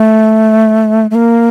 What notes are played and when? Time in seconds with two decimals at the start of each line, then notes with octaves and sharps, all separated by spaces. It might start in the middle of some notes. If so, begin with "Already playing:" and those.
Already playing: A3
1.11 A3
1.15 A#3